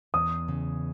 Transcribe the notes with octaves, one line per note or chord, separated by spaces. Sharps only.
E2 D#6
C#3